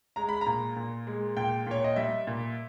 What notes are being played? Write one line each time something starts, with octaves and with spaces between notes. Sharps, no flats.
G#3 A#5
B5
A#5
A#2
A#2
G#3
A#2 G5
A#2 C#5
D#5
G3 E5
A#2